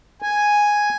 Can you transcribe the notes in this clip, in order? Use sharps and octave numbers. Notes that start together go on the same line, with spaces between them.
G#5